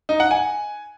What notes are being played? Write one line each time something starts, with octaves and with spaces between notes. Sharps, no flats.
D#4
F#5
G#5